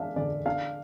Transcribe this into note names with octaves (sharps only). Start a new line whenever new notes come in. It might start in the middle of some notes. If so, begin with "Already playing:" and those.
Already playing: D4 E5 F5
D3 D5
D4 F5